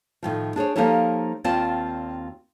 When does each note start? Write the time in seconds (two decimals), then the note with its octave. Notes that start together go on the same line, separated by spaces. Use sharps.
0.23 A2 D#3 F3
0.56 D4 G#4 C5 C#5
0.75 F3 A#3 D#4 G4 A4 C#5
1.44 D#2 C4 F4 D5 A5